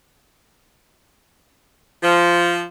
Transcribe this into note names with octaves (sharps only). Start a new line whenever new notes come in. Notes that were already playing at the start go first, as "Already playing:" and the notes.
F3